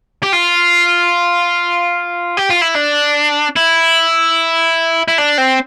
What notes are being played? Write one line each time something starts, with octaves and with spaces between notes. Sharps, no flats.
G4
F4
G4
F4
E4
D4
E4
E4
D4
C4